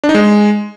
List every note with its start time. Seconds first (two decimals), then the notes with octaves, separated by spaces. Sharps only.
0.04 D4
0.09 D#4
0.14 G#3